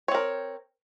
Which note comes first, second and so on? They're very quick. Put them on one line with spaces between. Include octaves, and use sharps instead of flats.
C#5 C4 A#4